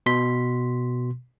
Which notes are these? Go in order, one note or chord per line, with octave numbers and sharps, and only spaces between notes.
B2 C6 B6